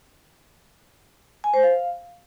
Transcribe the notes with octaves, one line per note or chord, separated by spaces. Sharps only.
G#5
C5
F5